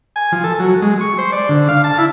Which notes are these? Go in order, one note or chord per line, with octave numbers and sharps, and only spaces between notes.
G#5
F3
A4
F#3
G#3
C#6
C5
D5
D3
F5
A5
E4